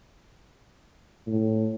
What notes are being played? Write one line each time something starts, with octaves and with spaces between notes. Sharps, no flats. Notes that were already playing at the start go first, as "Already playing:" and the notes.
A2